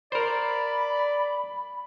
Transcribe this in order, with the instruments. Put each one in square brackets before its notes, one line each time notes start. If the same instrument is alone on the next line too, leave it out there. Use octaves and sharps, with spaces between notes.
[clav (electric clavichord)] A#4 C5 [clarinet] D5 [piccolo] B5